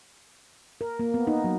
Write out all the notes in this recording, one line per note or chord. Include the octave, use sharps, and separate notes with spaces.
A#4
A#3
B3
D#4
F#3